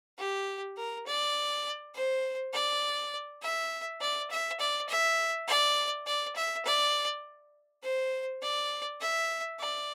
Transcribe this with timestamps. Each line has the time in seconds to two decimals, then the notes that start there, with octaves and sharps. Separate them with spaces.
0.19 G4
0.77 A#4
1.07 D5
1.95 C5
2.53 D5
3.42 E5
4.01 D5
4.31 E5
4.60 D5
4.89 E5
5.48 D5
6.06 D5
6.36 E5
6.65 D5
7.83 C5
8.42 D5
9.01 E5
9.60 D5